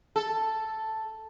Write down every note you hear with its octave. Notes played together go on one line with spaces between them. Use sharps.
A4